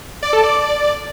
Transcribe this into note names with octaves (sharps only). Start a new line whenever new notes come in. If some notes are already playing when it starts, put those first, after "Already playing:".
D5
A4
D5